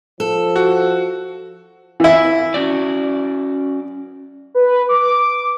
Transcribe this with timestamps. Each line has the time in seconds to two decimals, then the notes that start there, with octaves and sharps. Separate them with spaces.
0.20 F3 A4
0.56 F#4
2.00 E3 E4
2.54 C#4 F#4 D5
4.55 B4
4.89 D6